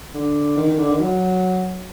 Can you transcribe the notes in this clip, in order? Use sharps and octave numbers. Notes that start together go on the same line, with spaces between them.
D3
D#3
D#3
D3
D#3
F#3